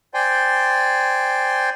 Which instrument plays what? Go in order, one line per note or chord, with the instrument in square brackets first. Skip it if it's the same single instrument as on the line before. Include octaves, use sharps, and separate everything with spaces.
[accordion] C5 D5 G5 G#5 C6